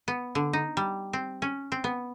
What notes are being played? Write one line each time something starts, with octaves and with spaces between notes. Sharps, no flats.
B3
D3
D#4
G3
C4
C#4
C4
B3